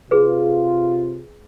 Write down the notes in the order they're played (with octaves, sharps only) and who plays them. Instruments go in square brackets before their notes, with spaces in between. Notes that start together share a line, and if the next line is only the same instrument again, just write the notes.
[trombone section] C3 F4 [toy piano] G#4 B4